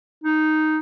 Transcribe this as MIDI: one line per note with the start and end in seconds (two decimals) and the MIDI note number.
0.24 0.79 63